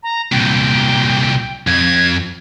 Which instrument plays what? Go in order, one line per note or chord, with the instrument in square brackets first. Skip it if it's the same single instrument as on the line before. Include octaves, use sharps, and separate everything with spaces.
[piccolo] A#5
[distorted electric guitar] C2 A#2 [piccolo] G5
[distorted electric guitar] F2 [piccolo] G#6